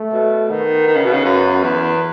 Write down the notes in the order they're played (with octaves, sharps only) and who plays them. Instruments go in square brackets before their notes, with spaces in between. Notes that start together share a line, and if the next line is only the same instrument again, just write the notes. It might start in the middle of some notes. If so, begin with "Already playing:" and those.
Already playing: [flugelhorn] A3
[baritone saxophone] B2
[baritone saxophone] D#3 [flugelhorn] B3
[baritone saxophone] D#3
C#3
B2
C#3
F#2
E2